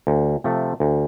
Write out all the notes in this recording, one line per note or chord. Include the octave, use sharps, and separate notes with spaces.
D2
C3 F3 A3
D2